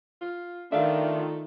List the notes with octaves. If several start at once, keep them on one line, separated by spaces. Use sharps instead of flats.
F4
D#3 A3 D4 F4 E5 F5